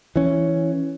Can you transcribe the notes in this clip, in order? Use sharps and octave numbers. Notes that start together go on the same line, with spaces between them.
E3 C#4